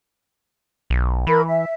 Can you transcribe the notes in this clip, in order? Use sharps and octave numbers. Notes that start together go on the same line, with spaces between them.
B1
E3 A#4 B5
E5